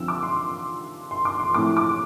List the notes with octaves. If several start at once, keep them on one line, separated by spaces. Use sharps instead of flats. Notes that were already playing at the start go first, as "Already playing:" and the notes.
Already playing: D3 F3 C4 F4 E6
D6
C6
C6
D6
C6
A2 F3 A3 C4 E4 D6
D6